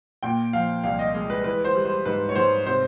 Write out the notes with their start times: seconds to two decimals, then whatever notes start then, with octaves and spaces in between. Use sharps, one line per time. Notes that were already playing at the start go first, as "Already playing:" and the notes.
0.23 A#2 G5
0.53 F3 F5
0.84 C2 F5
0.99 D#5
1.14 G#3
1.30 B4
1.44 E3 B4
1.65 C5
1.74 G3
1.85 C5
2.05 G#2 B4
2.29 C#5
2.35 G#2 C5
2.65 C3 C5